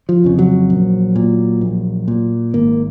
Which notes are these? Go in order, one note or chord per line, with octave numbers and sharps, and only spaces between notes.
F3
F2 C#3
F#3
A#1
A#2
A#1
A#2
G#1 A#3